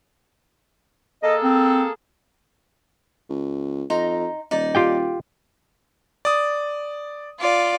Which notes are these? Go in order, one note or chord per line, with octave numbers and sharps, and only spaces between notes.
A#3 G#4 A4 D#5
C4
C#2
F2 D#4 A#5 C6
D#1 D#4 D5
F4 G4 G5
D5 D#6
F4 D5